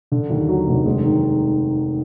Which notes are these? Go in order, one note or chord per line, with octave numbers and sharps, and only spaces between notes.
D3
D#2
F#3
F1
G#3
D#3